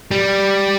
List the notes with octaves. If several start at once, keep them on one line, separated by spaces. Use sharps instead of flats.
G3